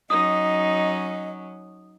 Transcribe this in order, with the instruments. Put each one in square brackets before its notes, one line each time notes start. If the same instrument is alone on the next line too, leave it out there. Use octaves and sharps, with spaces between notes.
[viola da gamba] F#3 C#4 [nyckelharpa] D#4 [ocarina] D#5 [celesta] D#6